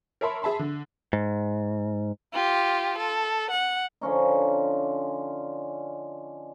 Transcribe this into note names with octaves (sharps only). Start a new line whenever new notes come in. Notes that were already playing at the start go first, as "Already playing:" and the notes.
A#4 C#5 E5 A5 B5 C6
G#4 E5 A5 B5 C6
D3
G#2
F4 G4
A4
F#5
D3 F3 C#4 D#4